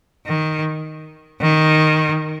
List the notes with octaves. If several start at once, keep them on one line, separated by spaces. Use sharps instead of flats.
D#3
D#3